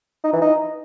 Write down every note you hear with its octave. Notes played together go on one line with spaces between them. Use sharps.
D#4
E3
D#4